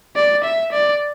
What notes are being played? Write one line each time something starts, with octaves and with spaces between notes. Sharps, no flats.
D5
E5
D5